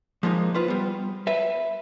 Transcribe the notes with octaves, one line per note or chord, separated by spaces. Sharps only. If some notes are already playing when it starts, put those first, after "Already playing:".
F3 G#3 A#3 D#4
F4 B4 C5
G3 B3
B4 E5